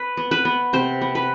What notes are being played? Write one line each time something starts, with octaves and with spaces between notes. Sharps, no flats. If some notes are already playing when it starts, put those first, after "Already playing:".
Already playing: B4
B3
B4
B3
C3 C5
B3
B4